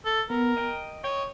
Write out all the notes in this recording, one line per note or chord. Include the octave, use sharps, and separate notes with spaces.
A4
B3 A#4
D#5 G5
C#5 D#5 G5